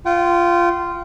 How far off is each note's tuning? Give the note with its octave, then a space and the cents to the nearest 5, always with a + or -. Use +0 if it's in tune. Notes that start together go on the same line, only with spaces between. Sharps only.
F4 -10 G5 -40